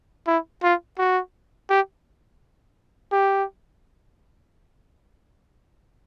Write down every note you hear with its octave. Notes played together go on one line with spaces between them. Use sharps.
E4
F4
F#4
G4
G4